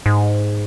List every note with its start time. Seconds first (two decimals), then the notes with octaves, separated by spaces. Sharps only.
0.06 G#2